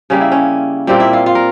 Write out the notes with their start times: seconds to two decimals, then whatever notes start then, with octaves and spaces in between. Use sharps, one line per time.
0.10 C#3 G3 A#3 C#4
0.21 E4
0.32 C#4
0.87 A#2 G3 A#3 C4
1.00 E4
1.13 F4
1.26 F4
1.35 A#4